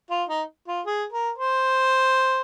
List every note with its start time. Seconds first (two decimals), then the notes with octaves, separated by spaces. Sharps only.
0.10 F4
0.29 D#4
0.68 F4
0.86 G#4
1.12 A#4
1.38 C5